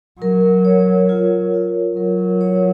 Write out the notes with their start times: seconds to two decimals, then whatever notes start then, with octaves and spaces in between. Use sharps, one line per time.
0.21 F#3 A#4
0.65 C#5
1.09 F4
1.54 F4
1.97 F#3 A#4
2.41 C#5